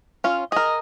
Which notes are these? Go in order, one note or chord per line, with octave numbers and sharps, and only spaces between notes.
C#4 F4
G#4 A#4 D#5